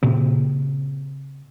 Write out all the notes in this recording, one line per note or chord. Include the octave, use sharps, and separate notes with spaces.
A#2 C#3 C4